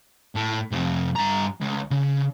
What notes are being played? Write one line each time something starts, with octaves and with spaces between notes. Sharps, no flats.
A2
F2 C3
G2 A#5
C#2
C#3